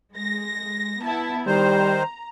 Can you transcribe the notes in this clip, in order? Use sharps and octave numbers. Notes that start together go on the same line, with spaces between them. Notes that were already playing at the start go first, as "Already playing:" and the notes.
G#3 A#6
B3 E4 A5
D#3 G3 C5 A#5